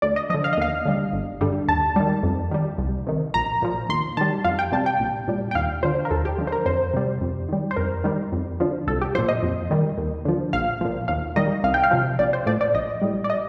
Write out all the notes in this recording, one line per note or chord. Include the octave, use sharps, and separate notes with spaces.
D2 D5
D#5
D3 F3 D#5
F5
D#5
D#2 F5
D3 G3
G1
G2 D3 G3
D#2 A5
D#3 G3
F2
D#3 G3
C2
C3 D#3
A#1 A#5
A#2 F3
D#2 C6
D#3 G3 A5
F2 F5
G5
C3 G3 A5
G5
A#1
A#2 G3
G5
D#2 F5
D3 F3 C5
A#4
D#2 A4
G4
D3 F3
C5
A#4
F2 C5
C3 G3
F2
D#3 G3
C5
F2 A#4
D#3 G3
F2
D3 F3
C2 A4
G4
A#2 F3 C5
D#5
F2
D#3 G3
D#2
D3 F3
A#1 F5
A#2 F3
D#2 F5
D#3 G3 D#5
C2 F5
G5
F5
C3 F3
A#1 D5
C5
A2 F3 D5
D5
A#1 D#5
A2 G3
D5
D#5